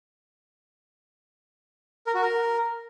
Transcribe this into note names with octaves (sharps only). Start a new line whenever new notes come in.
A#4
F#4
A#4